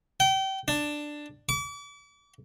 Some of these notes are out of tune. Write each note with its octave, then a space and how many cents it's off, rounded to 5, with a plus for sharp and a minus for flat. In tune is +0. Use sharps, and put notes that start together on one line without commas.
G5 -30
D4 +10
D6 -40